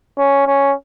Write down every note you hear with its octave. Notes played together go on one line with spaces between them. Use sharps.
C#4
C#4